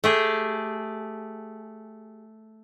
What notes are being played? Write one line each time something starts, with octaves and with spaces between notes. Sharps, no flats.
A3 G4 G#4